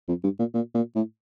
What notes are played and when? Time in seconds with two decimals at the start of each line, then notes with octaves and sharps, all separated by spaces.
0.08 F2
0.24 G2
0.39 A#2
0.54 A#2
0.75 A#2
0.95 A2